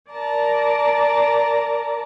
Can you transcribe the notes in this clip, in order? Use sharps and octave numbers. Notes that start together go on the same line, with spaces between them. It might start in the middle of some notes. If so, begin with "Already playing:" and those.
A#4 D5 A5 A#5